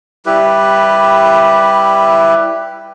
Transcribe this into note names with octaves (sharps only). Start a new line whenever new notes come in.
G3 E4 G4 B4